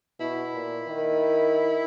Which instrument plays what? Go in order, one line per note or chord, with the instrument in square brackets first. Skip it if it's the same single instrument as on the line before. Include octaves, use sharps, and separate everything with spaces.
[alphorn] B2 [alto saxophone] E4
[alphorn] A#2
D#3